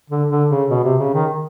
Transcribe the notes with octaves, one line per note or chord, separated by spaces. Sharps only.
D3
D3
C#3
B2
C3
C#3
D#3